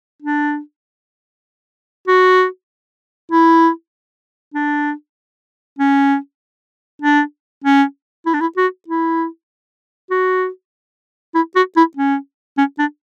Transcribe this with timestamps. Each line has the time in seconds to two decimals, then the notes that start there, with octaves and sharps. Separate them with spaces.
0.22 D4
2.08 F#4
3.32 E4
4.54 D4
5.79 C#4
7.02 D4
7.64 C#4
8.26 E4
8.34 D4
8.41 E4
8.57 F#4
8.88 E4
10.10 F#4
11.35 E4
11.56 F#4
11.76 E4
11.97 C#4
12.58 C#4
12.79 D4